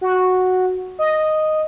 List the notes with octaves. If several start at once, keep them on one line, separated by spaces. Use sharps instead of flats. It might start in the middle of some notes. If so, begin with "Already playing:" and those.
F#4
D#5